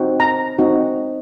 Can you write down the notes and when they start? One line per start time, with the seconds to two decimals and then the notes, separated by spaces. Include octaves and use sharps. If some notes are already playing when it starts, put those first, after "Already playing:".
Already playing: C4 D#4 F#4
0.20 A#5
0.58 C4 D#4 F#4